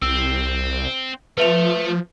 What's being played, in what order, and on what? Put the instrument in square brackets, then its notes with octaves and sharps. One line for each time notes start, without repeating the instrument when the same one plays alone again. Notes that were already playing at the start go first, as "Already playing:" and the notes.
[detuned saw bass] C2 [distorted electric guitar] C4 [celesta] E6
[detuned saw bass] F3 [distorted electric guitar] A3 [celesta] B4 E5 F7